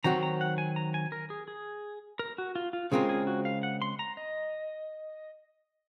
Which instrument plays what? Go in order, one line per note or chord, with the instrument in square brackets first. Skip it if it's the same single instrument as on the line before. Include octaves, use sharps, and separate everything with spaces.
[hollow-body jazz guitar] D#3 F#3 C4 F#4 [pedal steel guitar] A#5
[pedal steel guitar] A#5
F#5
G#5
A#5
G#5
A#4
G#4
G#4
A#4
F#4
F4
F4
[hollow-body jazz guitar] C#3 G#3 C4 F4 A#4 [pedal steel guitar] G#4
[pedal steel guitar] G#4
F#4
F5
F#5
C6
A#5
D#5